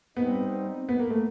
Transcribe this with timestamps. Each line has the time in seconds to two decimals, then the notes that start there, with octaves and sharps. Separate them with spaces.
0.17 G3 B3 C4 D#4
0.89 B3
0.99 A#3
1.10 A3